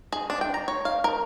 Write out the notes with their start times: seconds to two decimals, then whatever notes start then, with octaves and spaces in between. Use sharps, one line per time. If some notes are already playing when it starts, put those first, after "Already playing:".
0.12 G#4
0.30 D4
0.41 G5
0.54 A#5
0.68 C#5
0.85 F5
1.04 A#4